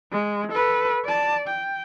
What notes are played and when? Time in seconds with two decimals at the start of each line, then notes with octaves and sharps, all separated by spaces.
0.12 G#3
0.51 A4 B4
1.05 D5 A5
1.48 G5